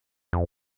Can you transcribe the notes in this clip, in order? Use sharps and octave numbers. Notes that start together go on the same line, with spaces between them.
F2